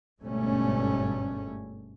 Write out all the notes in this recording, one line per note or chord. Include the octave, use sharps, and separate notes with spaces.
G1 G#2 B2 G3 A3 C#4